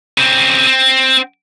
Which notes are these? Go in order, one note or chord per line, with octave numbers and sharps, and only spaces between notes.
C#3 C4
C4